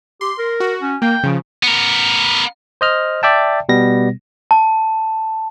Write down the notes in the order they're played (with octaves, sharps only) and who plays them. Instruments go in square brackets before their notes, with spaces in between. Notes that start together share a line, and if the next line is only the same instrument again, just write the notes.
[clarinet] G4 [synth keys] C6
[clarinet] A#4
[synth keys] F#4
[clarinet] C#4
[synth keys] A#3 [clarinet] G5
[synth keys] C#3 F3
[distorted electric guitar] B3 A#4
[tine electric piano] C5 D#5 F6
D5 E5 G5 A5
B2 G3 B3 A#6
[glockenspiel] A5